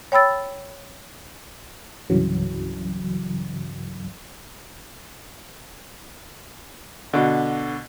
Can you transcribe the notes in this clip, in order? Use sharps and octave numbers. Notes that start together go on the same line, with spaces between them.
C#5 G5 B5 E6 A6
C2 G2 C#3 E3 F#3
B2 D3